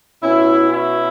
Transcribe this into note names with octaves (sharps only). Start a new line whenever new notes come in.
B2 C#4 E4
C#4 E4